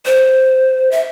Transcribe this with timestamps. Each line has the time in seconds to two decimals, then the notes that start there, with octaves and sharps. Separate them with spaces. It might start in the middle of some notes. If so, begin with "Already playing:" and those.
0.06 C5
0.91 E5